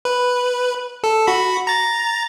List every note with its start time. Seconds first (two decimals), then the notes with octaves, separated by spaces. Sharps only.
0.05 B4
1.04 A4
1.27 F#4 B5
1.67 A#5 A6